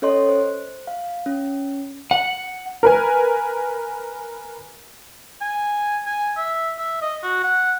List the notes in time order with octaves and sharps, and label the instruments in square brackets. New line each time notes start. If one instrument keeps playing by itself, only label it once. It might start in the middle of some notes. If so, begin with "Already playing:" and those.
[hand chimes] C#4 A4 C#5 D#5 C6
C5
F5
C#4
[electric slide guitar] F#5
[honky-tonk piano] A#4 B4 G#5
[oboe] G#5
G#5
E5
E5
D#5
F#4
F#5